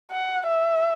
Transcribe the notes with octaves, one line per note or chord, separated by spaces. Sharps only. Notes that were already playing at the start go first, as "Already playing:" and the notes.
F#5
E5